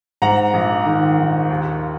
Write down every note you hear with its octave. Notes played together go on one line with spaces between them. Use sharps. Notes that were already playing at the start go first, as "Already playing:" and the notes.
G#2 F#5 A#5
A#1
D#3
A#1
D#2